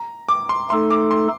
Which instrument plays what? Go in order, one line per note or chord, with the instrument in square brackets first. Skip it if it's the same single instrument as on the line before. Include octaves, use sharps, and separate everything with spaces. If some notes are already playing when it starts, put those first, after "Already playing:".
Already playing: [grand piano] A#5
D6
C6
[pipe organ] A3 D#4 A4 [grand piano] C6
[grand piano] D6
C6